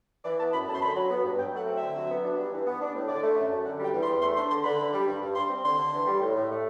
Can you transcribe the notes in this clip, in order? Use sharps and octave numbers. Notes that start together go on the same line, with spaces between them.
E3 D5
B3 A5
F#2 B5
F#2 A5
C6
D3 B5
F#3
B3
G2
F#3 G5
A3 F#5
C4
D3 E5
F#3
B3
D4
G2
E3
B3
D4
A2
D3 D5
A3
F#2
F#2
D3 F#5
G3 G5
E2
C6
E2
A3 C6
D4 C6
D3 C6
D3 B5
D3
G3
G2
G2
G3 C6
C4
D3 C6
D3
E3
G3
A2
A2
A3